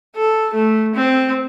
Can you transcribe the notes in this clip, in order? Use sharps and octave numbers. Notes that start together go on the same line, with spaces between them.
A4
A3
C4